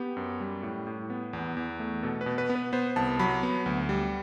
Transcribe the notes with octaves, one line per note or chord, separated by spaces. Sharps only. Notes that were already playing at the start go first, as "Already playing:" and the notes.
Already playing: B3 G4
F#2
G3
A2
A2
B3
E2
E2
A3
B2 A4
B4
B2
B4
B3
B4
B3 C5
C2 A5
F#3 B5
B3
D2
G3